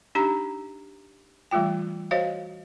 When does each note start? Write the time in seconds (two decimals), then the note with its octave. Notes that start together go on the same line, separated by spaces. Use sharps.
0.15 D4 D#4 G4 A#5
1.51 E3 G3 A3 F4 G5
2.11 F#4 C5 C#5 D#5 F5